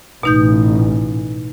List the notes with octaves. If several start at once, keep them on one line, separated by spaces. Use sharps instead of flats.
A1 B2 D#4 G6